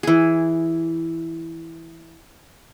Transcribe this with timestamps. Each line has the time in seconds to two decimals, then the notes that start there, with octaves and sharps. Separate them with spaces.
0.03 E3 G#4